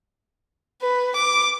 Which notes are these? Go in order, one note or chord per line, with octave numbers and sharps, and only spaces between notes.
B4
D6